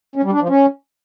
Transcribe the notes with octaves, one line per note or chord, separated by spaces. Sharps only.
C#4
G3
D4
F3
C#4